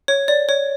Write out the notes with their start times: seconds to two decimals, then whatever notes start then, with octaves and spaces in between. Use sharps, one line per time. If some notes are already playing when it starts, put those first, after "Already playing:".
0.08 C#5
0.28 D5
0.49 C#5